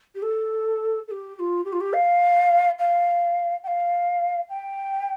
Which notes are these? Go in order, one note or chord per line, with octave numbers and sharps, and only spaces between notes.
G4
A4
A4
G4
G4
F4
G4
F4
G4
F5
F5
G5
F5
G5